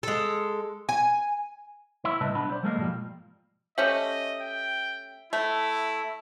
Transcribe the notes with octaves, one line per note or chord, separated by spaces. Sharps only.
G#3 A4
G#5
E4
C2 A2 C#3 B4 D#5 A5
B1 D4 F#5 B5
C5 D5
F#3 G#3 A#3 A4 D#5 F5
G#2 B2 D#3 F3 G3
A3 C#4 G4 D#5 E5
G5
A3 E4